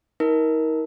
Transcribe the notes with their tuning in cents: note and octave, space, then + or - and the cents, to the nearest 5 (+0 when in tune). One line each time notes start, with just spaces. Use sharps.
D#4 +40 A#4 +10